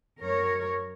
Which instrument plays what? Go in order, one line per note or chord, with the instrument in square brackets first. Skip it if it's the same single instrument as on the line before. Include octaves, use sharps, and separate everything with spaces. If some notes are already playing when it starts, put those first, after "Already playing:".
[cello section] F#2 A#4 C#5